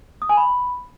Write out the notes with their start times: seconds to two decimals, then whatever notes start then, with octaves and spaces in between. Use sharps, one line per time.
0.22 D#6
0.29 G#5
0.37 B5